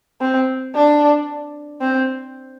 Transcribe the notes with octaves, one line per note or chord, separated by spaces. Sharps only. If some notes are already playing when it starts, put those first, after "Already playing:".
C4
D4
C4